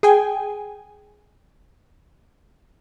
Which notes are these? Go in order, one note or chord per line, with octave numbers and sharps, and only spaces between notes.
G#4 G5 G#5